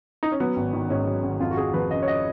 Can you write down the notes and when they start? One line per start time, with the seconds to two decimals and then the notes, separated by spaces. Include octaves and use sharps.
0.23 D#4
0.32 C#4
0.40 F#3 B3
0.57 G#1
0.73 D#3
0.90 G#2 C#4
1.07 F#3
1.24 G#1
1.40 F2 F4
1.51 F#4
1.57 F2 G#4
1.74 F3 B4
1.91 C#3 D#5
2.02 C#5
2.08 D#5